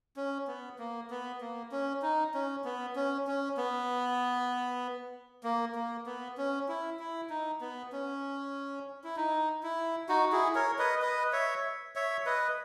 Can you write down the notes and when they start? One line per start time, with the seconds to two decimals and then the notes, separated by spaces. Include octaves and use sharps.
0.16 C#4
0.47 B3
0.79 A#3
1.10 B3
1.41 A#3
1.72 C#4
2.02 D#4
2.34 C#4
2.65 B3
2.96 C#4
3.27 C#4
3.57 B3
5.44 A#3
5.75 A#3
6.06 B3
6.37 C#4
6.68 E4
6.99 E4
7.30 D#4
7.61 B3
7.92 C#4
9.04 E4
9.17 D#4
9.63 E4
10.09 D#4 F#4
10.32 E4 G#4
10.55 A#4 C#5
10.79 B4 D#5
11.02 B4 D#5
11.32 C#5 E5
11.96 C#5 E5
12.26 B4 D#5